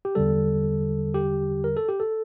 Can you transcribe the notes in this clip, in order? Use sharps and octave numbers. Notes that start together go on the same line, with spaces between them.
G4
E2 D3 G3 A4
G4
A#4
A4
G4
A4